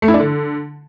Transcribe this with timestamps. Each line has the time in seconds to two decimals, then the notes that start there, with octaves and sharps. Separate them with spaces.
0.02 A3
0.08 E4
0.14 D4
0.20 D3